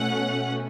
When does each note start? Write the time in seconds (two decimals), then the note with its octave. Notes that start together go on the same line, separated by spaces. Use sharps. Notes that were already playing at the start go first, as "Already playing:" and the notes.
Already playing: B2 A3 C#4 F#5